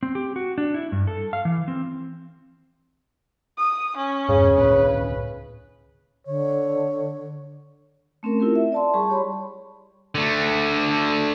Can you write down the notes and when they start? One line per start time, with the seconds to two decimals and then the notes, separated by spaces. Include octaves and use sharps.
0.03 C4
0.15 G4
0.36 F#4
0.58 D4
0.74 E4
0.92 G2
1.07 A4
1.33 F5
1.45 E3
1.68 C4
3.58 D#6
3.97 C#4
4.29 E2 G2 C#3
4.58 C#2 A2 C#4 B4
6.27 D3 C#5
8.23 A3 C4 C#4 A#4
8.40 E4 F4 G4 A#4
8.56 E5
8.72 D5 A5 C6
8.94 G3 G#4 A5 C#6
9.10 G4 C#5 B5 C6
10.15 D3 A3